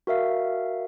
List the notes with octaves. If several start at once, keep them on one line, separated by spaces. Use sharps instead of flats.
F#4 A#4 E5 F5